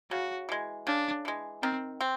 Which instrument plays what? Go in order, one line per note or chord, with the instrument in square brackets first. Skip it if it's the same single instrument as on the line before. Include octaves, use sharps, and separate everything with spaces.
[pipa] C#3 [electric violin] F#4
[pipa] E3 G#3
[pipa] C#3 [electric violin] D4
[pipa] E3 G#3
[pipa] D#3 [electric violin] C4
[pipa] C4